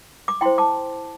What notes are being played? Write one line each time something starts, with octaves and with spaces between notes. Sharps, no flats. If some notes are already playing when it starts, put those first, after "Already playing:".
D6
E4 C5 G5 C6
A5 D6